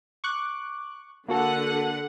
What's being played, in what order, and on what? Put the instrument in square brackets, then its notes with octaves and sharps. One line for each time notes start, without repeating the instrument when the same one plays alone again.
[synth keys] C#6 D6 F#6
[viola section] D3 F#5 [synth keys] A#3 F#4 A4